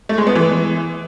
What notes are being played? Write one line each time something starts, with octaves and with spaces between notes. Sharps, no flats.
A3
G#3
B3
E3